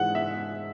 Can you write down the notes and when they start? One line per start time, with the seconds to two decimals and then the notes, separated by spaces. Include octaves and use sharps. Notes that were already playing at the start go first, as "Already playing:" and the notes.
Already playing: G#2 E3 G#3 F#5
0.15 E5